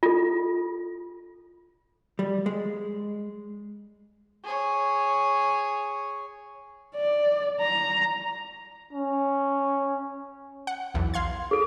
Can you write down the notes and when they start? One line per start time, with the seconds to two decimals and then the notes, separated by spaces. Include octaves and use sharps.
0.03 F4 A4
2.19 G3
2.46 G#3
4.44 G#4 C#5
6.96 D5
7.61 A#5
8.93 C#4
10.67 F#5
10.95 B1 E2
11.14 F5 C6 G#6
11.51 G#4 A4